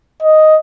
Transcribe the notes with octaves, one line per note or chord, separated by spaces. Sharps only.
D#5